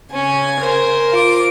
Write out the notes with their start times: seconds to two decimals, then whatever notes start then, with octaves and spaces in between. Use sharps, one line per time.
0.14 C#3 C#4 G#5
0.60 A#4 C5
1.13 F4 D6